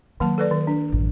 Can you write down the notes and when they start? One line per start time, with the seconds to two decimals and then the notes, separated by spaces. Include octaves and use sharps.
0.20 D#3 F#3 A#3 A5
0.38 A4 B4 D5
0.51 D#3
0.67 D4
0.92 A1 F#2